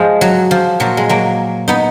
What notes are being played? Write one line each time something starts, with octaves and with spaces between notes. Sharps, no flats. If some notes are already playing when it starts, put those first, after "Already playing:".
Already playing: G#2 F3 G#3
F#3
F3
A#2 F3 F#3
G#3
F#3 A#3
B3 D#4